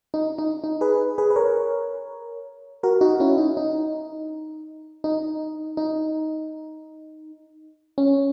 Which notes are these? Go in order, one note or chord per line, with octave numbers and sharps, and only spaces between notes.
D#4
D#4
D#4
G#4 B4
G#4 B4
B4
A#4 C#5
F#4 A#4
D#4 F#4
C#4 E4
D#4
D#4
D#4
D#4
C#4